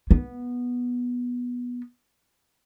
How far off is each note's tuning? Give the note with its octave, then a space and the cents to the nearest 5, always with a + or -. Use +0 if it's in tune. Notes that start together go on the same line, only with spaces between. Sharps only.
B3 -10